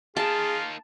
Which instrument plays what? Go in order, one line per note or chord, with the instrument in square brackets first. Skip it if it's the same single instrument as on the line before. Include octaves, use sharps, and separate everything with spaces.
[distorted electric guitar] A#3 D#4 [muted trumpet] F4 [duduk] G#4 [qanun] A5